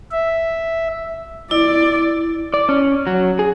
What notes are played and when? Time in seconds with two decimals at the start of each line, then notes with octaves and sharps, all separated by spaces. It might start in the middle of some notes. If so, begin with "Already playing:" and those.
0.11 E5
1.51 E4 D5
2.54 D5
2.69 C#4
3.07 F#3
3.39 G#4